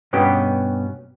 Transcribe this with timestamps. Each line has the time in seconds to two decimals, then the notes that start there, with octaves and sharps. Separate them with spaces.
0.13 G2 B2 B3 C#4 G4